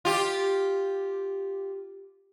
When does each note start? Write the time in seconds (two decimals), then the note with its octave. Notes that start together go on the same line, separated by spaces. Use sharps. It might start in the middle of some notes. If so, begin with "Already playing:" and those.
0.05 F4 G4